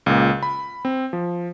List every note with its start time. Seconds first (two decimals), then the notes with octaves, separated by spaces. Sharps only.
0.06 C#2 A#2
0.43 B5
0.85 C4
1.13 F3